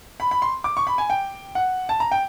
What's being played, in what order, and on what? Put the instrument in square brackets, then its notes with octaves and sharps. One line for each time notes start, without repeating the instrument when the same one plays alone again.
[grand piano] B5
B5
C6
D6
C#6
B5
G#5
G5
F#5
A5
A#5
G5